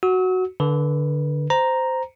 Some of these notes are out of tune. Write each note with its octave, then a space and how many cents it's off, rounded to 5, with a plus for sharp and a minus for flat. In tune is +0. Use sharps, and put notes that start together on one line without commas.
F#4 +0 E6 -40
D3 +0 B4 -25
C5 -15 A#5 +0